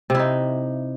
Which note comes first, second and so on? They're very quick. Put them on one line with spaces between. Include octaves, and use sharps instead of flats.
C3 E4 D#4